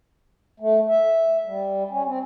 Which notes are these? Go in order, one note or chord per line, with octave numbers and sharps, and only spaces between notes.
A3
E5
G3
C#4
C4